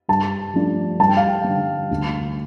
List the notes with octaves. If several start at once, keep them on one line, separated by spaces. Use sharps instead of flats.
G2 A5
F3 A3 D4
G2 A5
G5
F5
G5
D3 G3
D2